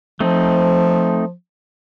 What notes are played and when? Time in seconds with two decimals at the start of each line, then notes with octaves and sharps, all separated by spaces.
0.20 F3 A3 C4 D#4